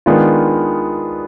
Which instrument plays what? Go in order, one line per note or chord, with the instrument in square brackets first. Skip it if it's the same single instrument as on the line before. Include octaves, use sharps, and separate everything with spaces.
[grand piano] D#3 G#3 B3 D4 F4